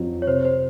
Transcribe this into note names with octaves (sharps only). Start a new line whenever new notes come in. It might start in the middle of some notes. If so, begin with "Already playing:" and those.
Already playing: F2 F#3
C#5
C3 C5
C5